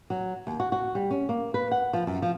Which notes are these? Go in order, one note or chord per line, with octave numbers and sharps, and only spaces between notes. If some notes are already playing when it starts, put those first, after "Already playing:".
F#3
D#2
F#4
F#4
G3
C#4
A#3
B4
F#5
F3
F#2
F3